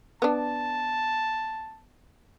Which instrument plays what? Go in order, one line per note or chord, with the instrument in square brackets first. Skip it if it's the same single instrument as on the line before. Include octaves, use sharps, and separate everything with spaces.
[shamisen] B3 D4 [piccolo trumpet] A5